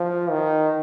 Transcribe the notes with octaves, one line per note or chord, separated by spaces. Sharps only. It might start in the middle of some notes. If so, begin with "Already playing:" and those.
Already playing: F3
D#3